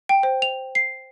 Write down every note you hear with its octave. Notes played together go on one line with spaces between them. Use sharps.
G5
C5
F7
C7